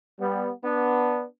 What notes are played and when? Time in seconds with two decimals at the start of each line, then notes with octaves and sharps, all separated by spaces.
0.20 G3 B3
0.64 B3 D4